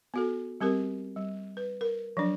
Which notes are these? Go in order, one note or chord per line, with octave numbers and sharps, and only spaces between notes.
B3 F#4 A4
G3 C4 G4 A#4
G3
B4
A#4
F3 F#3 D4